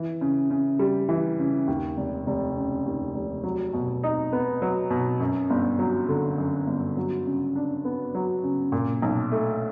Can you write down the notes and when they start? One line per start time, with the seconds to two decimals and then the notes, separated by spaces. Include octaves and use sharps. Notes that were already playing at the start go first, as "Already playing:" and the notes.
Already playing: E3
0.21 C#3
0.50 C#3
0.79 G3
1.09 E3
1.39 C#3
1.67 D#2
1.97 F1
2.27 F1
2.56 C#3
2.86 D#2
3.15 F1
3.44 F#3
3.73 B2
4.03 D#4
4.33 B3
4.62 F#3
4.90 B2
5.20 F#2
5.50 G1
5.79 F#3
6.09 D3
6.38 F#2
6.67 G1
6.97 F#3
7.26 C#3
7.56 D4
7.85 B3
8.15 F#3
8.43 C#3
8.72 A#2
9.02 B1
9.32 A3